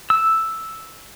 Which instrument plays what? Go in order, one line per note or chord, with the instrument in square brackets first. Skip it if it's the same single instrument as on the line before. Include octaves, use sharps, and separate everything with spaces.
[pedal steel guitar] E6